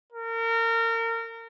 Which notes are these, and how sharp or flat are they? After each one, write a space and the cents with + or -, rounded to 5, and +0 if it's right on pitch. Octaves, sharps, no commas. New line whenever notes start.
A#4 -30